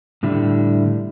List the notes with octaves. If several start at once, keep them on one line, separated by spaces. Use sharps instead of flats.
A2 D3 G3 E4